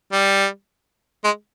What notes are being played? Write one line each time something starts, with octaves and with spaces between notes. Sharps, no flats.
G3
G#3